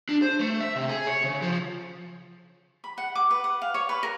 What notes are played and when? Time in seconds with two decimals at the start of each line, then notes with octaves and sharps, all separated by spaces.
0.09 D4
0.22 C5
0.40 A3
0.60 E5
0.76 C3
0.89 G#4
1.07 C#5
1.24 C#3
1.42 F3
2.84 B5
2.98 F#5
3.15 D6
3.31 B4
3.44 F#5
3.62 F5
3.74 C#5
3.89 B4
4.03 A#4